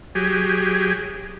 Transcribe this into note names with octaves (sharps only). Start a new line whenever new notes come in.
F#3 G4 G#4